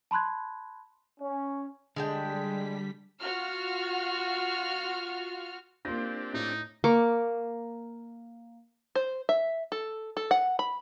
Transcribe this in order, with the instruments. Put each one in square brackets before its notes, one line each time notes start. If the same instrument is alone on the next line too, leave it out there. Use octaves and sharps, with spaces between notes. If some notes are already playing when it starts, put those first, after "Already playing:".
[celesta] A5 B5 C6 F#6 G#6
[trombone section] C#4
[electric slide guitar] D3 [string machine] G3 B6 [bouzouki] G#3 D4 G5
[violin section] F4 F#4 F6
[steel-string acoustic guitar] A#3 F4 [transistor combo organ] C4 D4 G4 [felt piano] C6 A#6
[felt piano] A2 [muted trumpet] D#4
[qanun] A#3 C#6 D6
[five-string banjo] C5
E5
A4
A4
F#5
B5